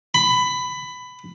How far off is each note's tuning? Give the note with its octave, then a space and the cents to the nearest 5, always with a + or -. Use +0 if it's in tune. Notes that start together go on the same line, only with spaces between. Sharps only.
B5 +15